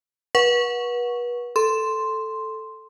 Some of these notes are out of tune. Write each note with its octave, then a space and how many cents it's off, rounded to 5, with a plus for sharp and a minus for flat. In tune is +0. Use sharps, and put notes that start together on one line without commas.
B4 -35 F#5 -20 C#6 +0
A4 +0 C6 +0